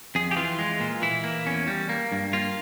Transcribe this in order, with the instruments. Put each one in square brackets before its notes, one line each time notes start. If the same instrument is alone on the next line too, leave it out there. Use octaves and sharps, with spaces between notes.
[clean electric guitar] F2 G#4
G4
E3 F4
G#3
A#2
E3 E4
A#3
E2 C#4
G3
A#3
G2
A#3 F4